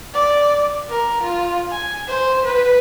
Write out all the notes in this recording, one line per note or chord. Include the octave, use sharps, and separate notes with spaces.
D5
A#4
F4
G#5
C5
B4